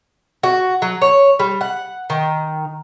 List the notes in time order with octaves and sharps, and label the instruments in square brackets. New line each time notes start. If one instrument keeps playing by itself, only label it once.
[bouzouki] F#4
F#3
C#5
G3
F#5
D#3